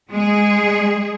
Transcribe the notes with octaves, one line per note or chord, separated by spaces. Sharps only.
G#3 G#4